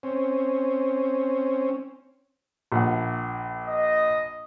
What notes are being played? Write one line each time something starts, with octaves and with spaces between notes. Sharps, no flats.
C4 C#4
A#1 F#5
D#5